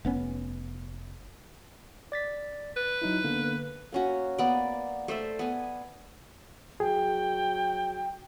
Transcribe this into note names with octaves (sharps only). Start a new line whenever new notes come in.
F1 B3 C#4
D5 A6 B6
B4
F#3 D#4 E4
D3 A#3 B3
A#3 C#4 F#4
A#3 B3 D5
A3 C5 D5 E5
B3 G#5
F#3 G#4 G5